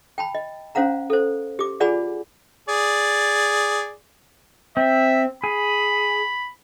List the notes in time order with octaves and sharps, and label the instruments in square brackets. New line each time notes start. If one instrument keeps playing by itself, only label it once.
[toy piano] G5 A5 B5
D#5
C#4 C5 F5 F#5 A#5
A4 C5
G4 D6
F4 G#4 D5 F#5 G#5 B5
[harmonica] G#4 D5
[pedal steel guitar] C4 [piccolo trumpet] E5
[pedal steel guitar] G#4 [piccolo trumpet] B5